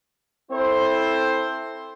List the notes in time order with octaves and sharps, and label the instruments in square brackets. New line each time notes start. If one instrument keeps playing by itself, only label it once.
[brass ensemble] C4 E4 A4 C5